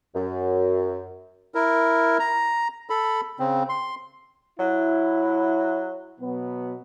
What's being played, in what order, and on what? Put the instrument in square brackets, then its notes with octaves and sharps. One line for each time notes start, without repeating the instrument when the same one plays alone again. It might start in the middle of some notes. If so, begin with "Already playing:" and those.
[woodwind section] F#2
[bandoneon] E4 A#4
A#5
A4 B5
C#3 C4
C6
[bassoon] F#3 [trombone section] E4
[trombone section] B2 F#3 B3